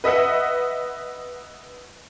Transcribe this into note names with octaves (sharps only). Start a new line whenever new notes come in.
B4 D#5 E5 F#5